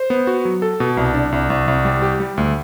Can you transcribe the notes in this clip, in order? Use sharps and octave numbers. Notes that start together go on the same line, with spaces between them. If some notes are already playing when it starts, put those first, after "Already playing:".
Already playing: C5
B3
F#4
F#3
A4
B2
C2
D4
C2
C2
C2
G3
G4
G3
D2